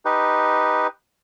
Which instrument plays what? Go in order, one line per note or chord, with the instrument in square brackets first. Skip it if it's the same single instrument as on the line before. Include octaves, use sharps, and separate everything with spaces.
[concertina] D#4 G4 B4